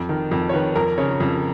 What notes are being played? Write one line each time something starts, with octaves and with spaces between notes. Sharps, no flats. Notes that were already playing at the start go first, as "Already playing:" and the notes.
Already playing: F2
D#3
F2
C#5
D#3 B4
F2 A#4
C#3 C#5
F2